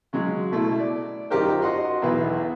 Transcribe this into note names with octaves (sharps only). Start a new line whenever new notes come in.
C#3 F#3 G#3
B2 A3 E4
D5
F#2 D#4 F4 G4 A#4 C5
F#4 D#5 F#5 C6
B1 E2 E4 B4